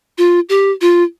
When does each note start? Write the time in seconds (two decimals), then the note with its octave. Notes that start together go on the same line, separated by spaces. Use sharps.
0.18 F4
0.49 G4
0.81 F4